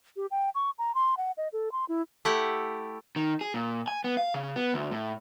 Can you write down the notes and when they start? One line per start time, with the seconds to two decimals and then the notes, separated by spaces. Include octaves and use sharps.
0.17 G4
0.31 G5
0.55 C#6
0.78 A#5
0.95 C6
1.17 F#5
1.37 D#5
1.53 A4
1.72 C6
1.89 E4
2.25 A3 E4 G4 F#5
3.16 D#3
3.41 G#4
3.54 A#2
3.88 G#5
4.04 B3
4.17 F5
4.34 C#3
4.56 B3
4.74 D2
4.91 A2